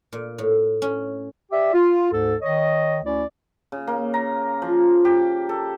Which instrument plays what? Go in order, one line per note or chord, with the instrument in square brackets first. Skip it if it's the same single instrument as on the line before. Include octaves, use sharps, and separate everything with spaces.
[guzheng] A#2
A2
C#4
[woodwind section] G4 D5 E5
F4
D2 G#2 A4
D#3 C#5 D#5
D2 C#4 E4 D5
[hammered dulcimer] C#3
A#3
A#5
F3
G4
A4